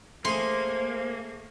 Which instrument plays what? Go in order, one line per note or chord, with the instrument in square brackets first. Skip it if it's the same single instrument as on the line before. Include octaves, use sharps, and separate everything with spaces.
[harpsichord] A3 G#4 [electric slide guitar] A#3 [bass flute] C5 [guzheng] C6